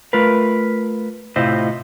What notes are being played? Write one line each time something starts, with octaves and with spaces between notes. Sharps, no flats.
A3 F4 A#4 B4
A2 C3 E4 F4 C5 D#5